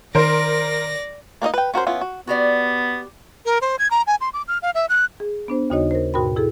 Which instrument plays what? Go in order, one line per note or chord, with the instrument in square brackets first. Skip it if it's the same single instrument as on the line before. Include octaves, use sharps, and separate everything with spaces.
[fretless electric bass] D#3 [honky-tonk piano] A#4 C5 [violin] D5 A#6
[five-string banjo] A#3 D4 D#4 D#5
B4 G5
C#4 F#4 A#4 C5
B3 C#4 E4 F4
F#4
[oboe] B3 [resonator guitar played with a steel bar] F#4 G4 D5
[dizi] A#4
C5
G#6
A#5
G#5
C6
D6
F6
F5
E5
F#6
[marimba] G#4
B3 D4 C5
D#2 C#3 D#4 F#4 C#5 D#5
A#4 C5
G#2 B2 F#4 A#4 G5 B5
E4 G#4 A4